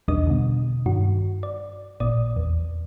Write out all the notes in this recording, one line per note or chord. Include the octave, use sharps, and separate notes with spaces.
B1 E2 G3 D4 D#5 D#6
B2 D3
G2 D#3 F#4
D5
A1 A#2 D5 D#6
E2